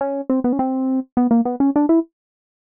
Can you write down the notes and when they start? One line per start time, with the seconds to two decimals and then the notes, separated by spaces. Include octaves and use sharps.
0.01 C#4
0.30 C4
0.44 B3
0.53 C#4
0.59 C4
1.17 B3
1.31 A#3
1.45 B3
1.60 C#4
1.76 D4
1.89 E4